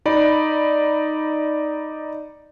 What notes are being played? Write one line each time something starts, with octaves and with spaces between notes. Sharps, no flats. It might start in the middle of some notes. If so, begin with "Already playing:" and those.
D#4 D5 B5